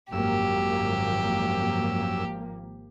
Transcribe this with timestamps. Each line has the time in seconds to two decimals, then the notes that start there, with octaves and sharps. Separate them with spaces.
0.12 G#1 F#2 F3 A#3 G4 E6